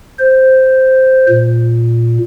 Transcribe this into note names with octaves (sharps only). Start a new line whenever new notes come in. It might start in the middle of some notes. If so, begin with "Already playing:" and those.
C5
A#2